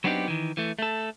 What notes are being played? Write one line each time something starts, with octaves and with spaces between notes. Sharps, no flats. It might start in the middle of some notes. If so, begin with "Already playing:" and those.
F#3 B3 C4 D4 D#4 G4
D#3 E3
E3 A3
A3 A4